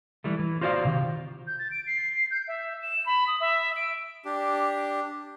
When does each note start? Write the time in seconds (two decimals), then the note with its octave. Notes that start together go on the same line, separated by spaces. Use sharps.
0.24 E3 G3 A3
0.39 E3
0.61 F4 F#4 C5 D5 E5 F5
0.85 C3 D#3 G4
1.47 G6
1.59 A6
1.71 D7
1.87 C7
2.31 G6
2.48 E5
2.82 E7
3.06 B5
3.27 D#6
3.40 E5
3.76 D7
4.25 D4 G4